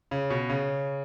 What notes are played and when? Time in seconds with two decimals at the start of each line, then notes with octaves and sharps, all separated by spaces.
0.11 C#3
0.30 B2
0.49 C#3